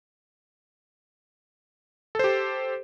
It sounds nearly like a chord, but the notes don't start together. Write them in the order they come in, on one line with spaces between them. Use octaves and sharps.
A4 C5 G4